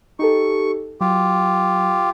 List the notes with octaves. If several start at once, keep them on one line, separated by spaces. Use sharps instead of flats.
D#4 G4 A4 C#6
F#3 F4 G4